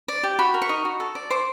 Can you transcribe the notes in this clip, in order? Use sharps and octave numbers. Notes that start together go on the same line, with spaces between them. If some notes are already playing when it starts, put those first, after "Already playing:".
D5
G4
F#4 B5
A#4
C#6
D#4
F#4
A4
D5
C5 D6